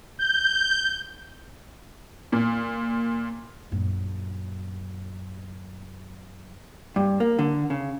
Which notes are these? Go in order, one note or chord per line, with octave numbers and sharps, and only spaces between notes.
G6
A#2
A#1 F#2
G2
A#3
D3
C#3